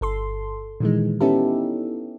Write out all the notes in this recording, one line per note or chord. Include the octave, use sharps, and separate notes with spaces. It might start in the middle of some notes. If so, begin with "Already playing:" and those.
G1 A4 C6
A#2 D#3 E3 G#3
B3 C#4 D#4 E4 G4 A4